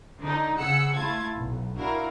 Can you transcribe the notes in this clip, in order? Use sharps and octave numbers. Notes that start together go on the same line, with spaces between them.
D3 D#4
C#3 G#4 F#5 E6 C#7
A3 E4 F4 A5 G#6
B1
D4 E4 F#4 A#4 F5